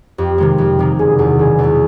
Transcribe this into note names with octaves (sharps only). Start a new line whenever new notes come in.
F2 G4
C3 D#3 G#3
F2
C3 D#3 G#3
F#1 G#4
E2 B2 G#4
F#1 G#4
E2
B2